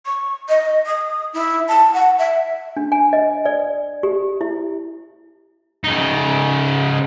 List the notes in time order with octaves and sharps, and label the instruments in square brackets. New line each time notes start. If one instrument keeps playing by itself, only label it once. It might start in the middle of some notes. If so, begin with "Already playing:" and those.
[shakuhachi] C#6
D#5
D#6
E4
A5
F#5
E5
[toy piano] D4
G#5
D#5
D5
G4
E4
[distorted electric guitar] C#3 D#4